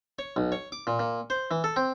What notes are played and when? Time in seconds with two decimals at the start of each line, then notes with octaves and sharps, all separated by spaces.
0.19 C#5
0.36 B1
0.52 C#5
0.72 D6
0.87 A#2
0.99 A#2
1.30 C5
1.51 E3
1.64 A4
1.76 C4